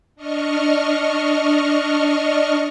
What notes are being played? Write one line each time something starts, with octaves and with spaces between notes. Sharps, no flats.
D4 D#5 C#6 F6